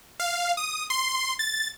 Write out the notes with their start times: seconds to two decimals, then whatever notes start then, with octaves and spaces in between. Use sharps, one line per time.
0.20 F5
0.57 D#6
0.90 C6
1.39 A6